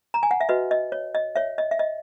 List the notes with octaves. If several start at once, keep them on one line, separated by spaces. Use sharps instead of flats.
A#5
G#5
F#5
E5
F#4 B4 D#5
D#5
C#5
D#5
C#5 E5
D#5
E5
D#5